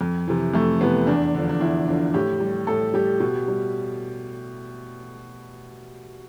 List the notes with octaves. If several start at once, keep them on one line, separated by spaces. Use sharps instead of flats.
F2
C3 E3
F2 A3
C3 E3 B3
E2 D4
D3 F3
D4
E2 E4
D3 F3
A2 G4
G3
A2 A4
G3 G4
B2
G3